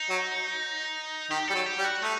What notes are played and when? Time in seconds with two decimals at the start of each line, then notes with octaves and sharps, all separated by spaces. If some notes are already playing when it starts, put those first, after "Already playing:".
Already playing: D#4
0.09 F#3
1.30 D#3 G4
1.48 G3 A4
1.54 F#3
1.66 G4
1.78 G3
1.84 F#4
2.03 A3 D#4